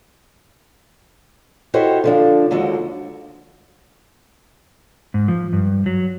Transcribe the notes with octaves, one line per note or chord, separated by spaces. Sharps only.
E4 F#4 G4 A4 C5 D#5
D3 F3 D4
D#2 D3 F3 G#3 F#4
G#2
F3
G2
F#3